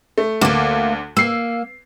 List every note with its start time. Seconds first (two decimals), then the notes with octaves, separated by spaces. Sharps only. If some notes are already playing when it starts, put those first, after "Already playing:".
0.18 A3
0.41 D2 A3 A#3 D6
1.17 A#3 E6 C7